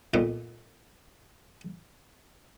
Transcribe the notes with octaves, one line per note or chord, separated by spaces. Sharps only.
F2 A#2 D#3 B3